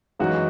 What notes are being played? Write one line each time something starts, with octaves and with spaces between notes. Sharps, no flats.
F#2 E3 G#3 D#4 F#4